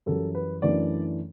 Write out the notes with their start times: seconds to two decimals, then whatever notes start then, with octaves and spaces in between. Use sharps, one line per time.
0.06 F#2 E3 G3 A4
0.35 B4
0.62 F#2 E3 A3 D4 D5